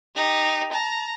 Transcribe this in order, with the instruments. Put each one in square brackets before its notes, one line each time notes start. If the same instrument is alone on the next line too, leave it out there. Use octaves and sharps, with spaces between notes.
[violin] D#4 G4
A5 A#5